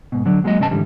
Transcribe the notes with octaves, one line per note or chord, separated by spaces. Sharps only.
G#2 B2
D3 F#3 D4
F#3 G#3 A#3 F#4 D#5
G2 C3 C#4 D#5 A5
G#2 D3 E3 G3